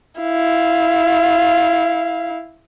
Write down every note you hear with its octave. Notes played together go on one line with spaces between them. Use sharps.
E4 F5